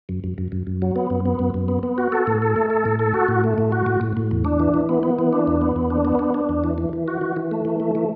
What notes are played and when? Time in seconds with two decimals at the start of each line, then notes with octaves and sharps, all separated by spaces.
0.09 F#2
0.24 F#2
0.38 F#2
0.52 F#2
0.67 F#2
0.82 F#3
0.96 B3
1.10 F#2
1.25 B3
1.39 F#2
1.54 F#2
1.68 B3
1.83 B3
1.98 F#4
2.12 A4
2.27 A2
2.42 A4
2.56 A3
2.70 A4
2.85 A2
2.99 A4
3.14 F#4
3.28 A2
3.44 A3
3.58 A2
3.72 F#4
3.86 A2
4.01 A2
4.17 A2
4.31 E2
4.45 D4
4.60 E3
4.74 E3
4.89 B3
5.03 B3
5.19 E3
5.33 D4
5.47 E2
5.61 B3
5.76 E2
5.90 D4
6.05 B3
6.19 D4
6.34 D4
6.49 E2
6.64 E3
6.78 E3
6.93 E3
7.08 F#4
7.21 E3
7.36 E3
7.51 A3
7.65 E3
7.80 A3
7.95 E3